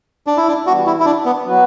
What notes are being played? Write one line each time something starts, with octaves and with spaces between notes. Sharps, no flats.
D4
E4
D4
E3 G3 B3 F#4
E4
E4
D4
B3
F#3 B3 F#4 B4